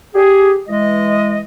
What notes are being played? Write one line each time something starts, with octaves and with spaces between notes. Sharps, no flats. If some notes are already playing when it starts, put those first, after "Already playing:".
G4 G#4
E3 G#3 D#5